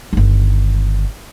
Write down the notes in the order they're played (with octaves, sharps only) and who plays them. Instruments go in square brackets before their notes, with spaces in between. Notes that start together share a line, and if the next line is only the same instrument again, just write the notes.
[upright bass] G1 D#3